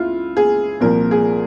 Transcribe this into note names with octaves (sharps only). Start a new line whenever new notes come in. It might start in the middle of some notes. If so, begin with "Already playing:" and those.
Already playing: C#2 E4 F4
G#4
C2 A#2 F3 A#4
G#4